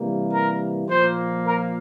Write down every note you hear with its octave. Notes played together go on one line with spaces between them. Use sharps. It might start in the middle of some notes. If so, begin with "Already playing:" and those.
Already playing: C3 E3 G3 A#3
A#4
A#2 F3 A#3 C5
A#4